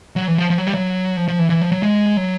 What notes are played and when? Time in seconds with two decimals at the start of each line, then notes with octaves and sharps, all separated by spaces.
0.16 F#3
0.28 E3
0.38 F3
0.50 F3
0.58 F#3
0.67 G3
0.74 F#3
1.17 F3
1.28 F3
1.39 E3
1.50 E3
1.61 F3
1.72 F#3
1.83 G#3
2.17 F#3